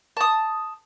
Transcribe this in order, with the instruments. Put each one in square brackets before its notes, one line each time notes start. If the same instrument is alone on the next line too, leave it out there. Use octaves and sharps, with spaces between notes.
[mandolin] A5 D#6